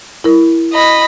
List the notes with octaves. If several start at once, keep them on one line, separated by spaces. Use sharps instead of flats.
E4 A#4
D#5 B5